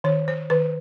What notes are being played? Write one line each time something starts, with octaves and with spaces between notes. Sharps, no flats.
D#3 C#5
C5
D#3 B4